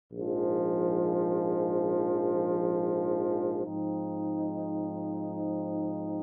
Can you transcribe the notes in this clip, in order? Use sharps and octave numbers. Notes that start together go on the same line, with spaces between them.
A#1 G#2 F3
G#2 F3 C4 D#4